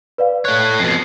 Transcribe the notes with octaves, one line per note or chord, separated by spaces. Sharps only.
B4 D5 F5
A3 C#5 F#6
F2 B2 C7